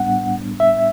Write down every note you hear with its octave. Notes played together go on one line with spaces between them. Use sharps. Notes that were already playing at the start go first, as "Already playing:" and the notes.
Already playing: A2 G3 B3 D4 F#5
E5